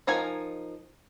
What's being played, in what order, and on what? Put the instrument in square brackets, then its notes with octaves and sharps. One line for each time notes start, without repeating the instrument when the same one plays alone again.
[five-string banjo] F3 D#4 A#4 G#5